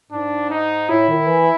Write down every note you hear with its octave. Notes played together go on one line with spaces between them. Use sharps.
G#2 D4
D#4
A2 E4
D#3
E3